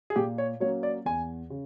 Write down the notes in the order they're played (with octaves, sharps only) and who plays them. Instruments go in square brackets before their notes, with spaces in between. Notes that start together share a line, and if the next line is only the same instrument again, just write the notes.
[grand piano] G#4
A#2 G4
C#5
F#3 A#3 C#4 C#5
D5
E2 G#5
C#3